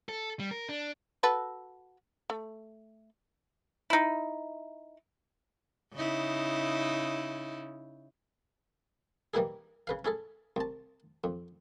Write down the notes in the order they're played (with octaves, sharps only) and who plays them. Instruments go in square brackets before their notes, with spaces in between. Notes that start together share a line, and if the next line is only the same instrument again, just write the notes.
[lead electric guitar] A4
G3
A#4
D4
[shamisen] F#4 A4 B4
A3
[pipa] D#4 E4
[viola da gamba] C#3 D#4 E4
[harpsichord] E3 G3 A#3 D#4 E4 G#4
C#3 B4 F5
C#4 E4 G#4 A4
C2 A5
F2